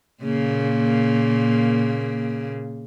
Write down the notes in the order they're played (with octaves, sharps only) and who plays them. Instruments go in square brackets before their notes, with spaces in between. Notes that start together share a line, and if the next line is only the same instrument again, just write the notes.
[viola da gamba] A#2 C#3 A#3